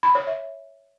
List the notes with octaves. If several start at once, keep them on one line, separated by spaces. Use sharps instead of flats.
B5
C#5
E5